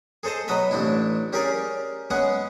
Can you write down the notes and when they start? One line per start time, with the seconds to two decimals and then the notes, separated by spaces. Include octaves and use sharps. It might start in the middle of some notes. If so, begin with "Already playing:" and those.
0.23 G#4 A4 C5 D#5 A5
0.48 B2 F#3 B4 D#5 E5 B5
0.71 A1 C4 D4 E4
1.33 C#4 G4 G#4 A#4 C#5 D5
2.10 G#3 B3 C#4 G#4 F#5